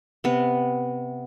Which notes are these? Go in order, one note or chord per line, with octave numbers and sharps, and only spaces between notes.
C3 B3